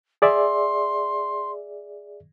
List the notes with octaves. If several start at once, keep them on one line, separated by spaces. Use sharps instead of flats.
G#4 D5 E5 C6